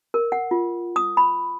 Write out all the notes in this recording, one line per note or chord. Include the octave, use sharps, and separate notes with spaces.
A#4
F#5
F4
D#6
B5